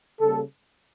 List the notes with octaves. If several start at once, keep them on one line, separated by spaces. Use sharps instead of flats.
C#3 G3 A#3 A4